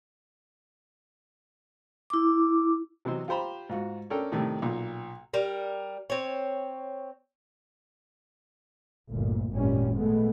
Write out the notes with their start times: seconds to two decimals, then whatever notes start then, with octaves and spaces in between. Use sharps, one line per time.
2.10 E4 D6
3.05 C3 E3 F#3 C5 D#5
3.28 F4 G4 C5 A#5 B5
3.69 G#2 F4 F#4
4.10 C#4 D4 A4 A#4 G5
4.32 A2 C3 D#3 G3 A3
4.62 B1 A#2
5.34 G3 A#4
6.10 C4 C#5
9.10 G1 D2 A#2
9.52 G#1 F#2 A#2 G3 C#4
9.97 A#2 G#3 A3 B3